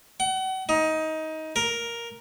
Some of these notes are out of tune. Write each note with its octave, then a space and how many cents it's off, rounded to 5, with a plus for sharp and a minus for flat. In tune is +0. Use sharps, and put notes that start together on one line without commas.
F#5 +35
D#4 +20
A#4 +5